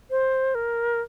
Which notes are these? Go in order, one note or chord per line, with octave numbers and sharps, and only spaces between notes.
C5
A#4